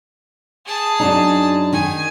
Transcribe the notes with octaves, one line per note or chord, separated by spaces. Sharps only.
G#4 A5
F#2 D4 D#4
D#3 G#5